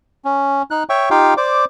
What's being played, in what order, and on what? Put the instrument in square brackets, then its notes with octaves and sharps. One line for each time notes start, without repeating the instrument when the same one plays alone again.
[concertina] C#4
D#4 F#6
C#5 E5 G5 C#6
D#4 F4 G4 F5 G5
C5 D5 D6